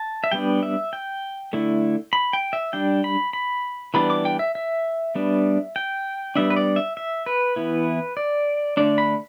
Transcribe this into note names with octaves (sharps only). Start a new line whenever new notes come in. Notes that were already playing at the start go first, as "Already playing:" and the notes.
Already playing: A5
E5
G3 B3 D4 G5
E5
G5
D3 A3 E4
B5
G5
E5
G3 D4 G5
B5
B5
E3 G3 B3 D4 B5
D6
G5
E5
E5
G3 B3 D4
G5
G3 B3 D4 E5
B4
D5
E5
E5
B4
E3 B3 E4
D5
D3 A3 D4 D5
B5